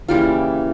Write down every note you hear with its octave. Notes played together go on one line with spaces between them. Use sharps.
C#3 E3 G3 A#3 F4